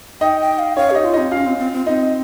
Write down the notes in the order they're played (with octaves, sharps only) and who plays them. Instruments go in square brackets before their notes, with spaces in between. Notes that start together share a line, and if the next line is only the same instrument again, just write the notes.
[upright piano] D#4 D#5 [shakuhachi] G5
[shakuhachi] G5
F5
[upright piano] C#4 C#5 [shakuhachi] F5
[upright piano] D#4 D#5 [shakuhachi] G4
[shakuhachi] F4
[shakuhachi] C4 [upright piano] D#4 D#5
[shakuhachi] C#4 [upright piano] F4 F5
[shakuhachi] C4
C4
C4
[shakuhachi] C4 [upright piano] D#4 D#5